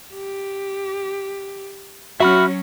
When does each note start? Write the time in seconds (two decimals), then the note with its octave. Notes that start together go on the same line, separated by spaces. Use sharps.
0.14 G4
2.20 F#3 C#4 F#4 E5 B5 F6